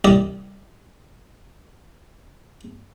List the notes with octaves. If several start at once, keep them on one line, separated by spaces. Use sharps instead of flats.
C2 G3 D5 D#5 D#6